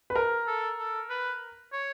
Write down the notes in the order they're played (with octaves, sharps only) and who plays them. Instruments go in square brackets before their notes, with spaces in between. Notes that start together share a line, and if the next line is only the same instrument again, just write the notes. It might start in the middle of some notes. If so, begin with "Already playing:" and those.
[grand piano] B4
A#4
[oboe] A4
A4
B4
C#5